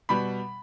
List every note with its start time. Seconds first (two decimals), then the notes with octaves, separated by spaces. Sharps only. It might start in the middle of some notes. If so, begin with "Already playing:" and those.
0.09 B2 G3 B3 B5